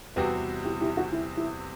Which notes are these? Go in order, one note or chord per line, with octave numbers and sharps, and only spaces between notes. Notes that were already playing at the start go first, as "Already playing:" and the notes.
E2 C3 G3 C4 F#4 G4 B4
E4 G4
E4 G4
F#4
E4
E4